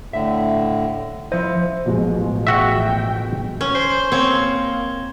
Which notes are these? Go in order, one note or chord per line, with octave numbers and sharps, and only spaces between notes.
A2 D3 E5
F3 E4 C5 D#5
A1 B2 F3 G#3
F#4 E5 G5
C#4
C5
A#3 C4 C#5